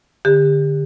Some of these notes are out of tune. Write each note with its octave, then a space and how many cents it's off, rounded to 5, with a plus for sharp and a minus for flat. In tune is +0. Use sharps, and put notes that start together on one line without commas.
D3 +0 G4 +30